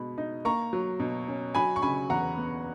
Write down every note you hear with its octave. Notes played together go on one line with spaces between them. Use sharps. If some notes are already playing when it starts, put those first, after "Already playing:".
Already playing: B2 G#3 B5
D#4
A#3 A#5 C#6
F#3
B2
C#4
F#3 G#5 B5
C#6
C#3 G#5 B5
E2 F#5 A#5
B3